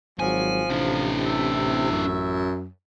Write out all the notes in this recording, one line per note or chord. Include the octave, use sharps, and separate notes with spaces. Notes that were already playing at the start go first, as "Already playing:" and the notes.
G#1 F3 F#3 G#5
A1 C3 D4 E4
E5
F#2